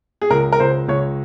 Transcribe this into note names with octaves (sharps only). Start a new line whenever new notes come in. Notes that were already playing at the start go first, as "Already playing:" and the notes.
G#4
C#2 A#4
A#4
C#2 C5
C#2 C#5